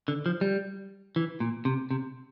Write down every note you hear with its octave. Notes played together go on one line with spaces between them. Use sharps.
D3
F3
G3
E3
A#2
C3
C3